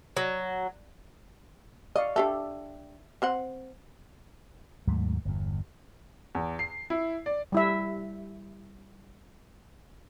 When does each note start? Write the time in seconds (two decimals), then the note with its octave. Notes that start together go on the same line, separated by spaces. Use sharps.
0.17 F#3
1.96 D5 D#5 F5 C#6
2.16 D4 G4 A4 E5 A5
3.22 C4 C5 F#5
4.87 D#2 G#2 F#3 A3
5.25 G1 E2
6.35 E2
6.59 C7
6.90 E4
7.26 D5
7.52 G3 E4 E5